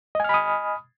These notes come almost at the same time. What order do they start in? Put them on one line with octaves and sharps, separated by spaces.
D#5 G#5 F6 B5 D#6